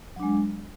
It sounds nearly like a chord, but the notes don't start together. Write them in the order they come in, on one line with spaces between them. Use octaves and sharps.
F#3 D4 G#3